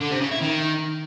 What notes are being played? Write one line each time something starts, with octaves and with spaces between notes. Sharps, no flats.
D3
C3
C#3
E4
D#3